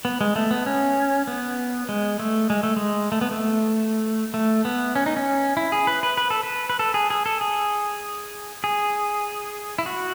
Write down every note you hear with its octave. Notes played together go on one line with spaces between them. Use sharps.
B3
G#3
A3
B3
C#4
B3
G#3
A3
G#3
A3
G#3
A3
B3
A3
A3
B3
C#4
D#4
C#4
E4
G#4
B4
B4
B4
A4
B4
B4
A4
G#4
G#4
A4
G#4
G#4
E4
F#4